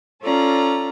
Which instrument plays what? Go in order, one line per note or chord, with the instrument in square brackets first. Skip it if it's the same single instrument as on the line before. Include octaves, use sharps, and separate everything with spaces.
[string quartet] C#4 F4 A4 D5 A#5